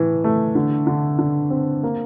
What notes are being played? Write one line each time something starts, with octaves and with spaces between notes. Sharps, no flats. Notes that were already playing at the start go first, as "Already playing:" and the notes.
Already playing: A2 E3
A3
D3
D3
D3
C4
A#3